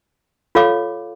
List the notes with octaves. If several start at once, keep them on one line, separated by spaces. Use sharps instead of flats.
F4 A4 C#5 F5 D6